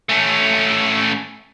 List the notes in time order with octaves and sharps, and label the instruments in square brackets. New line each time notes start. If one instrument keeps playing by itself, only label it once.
[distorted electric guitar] A3 C#4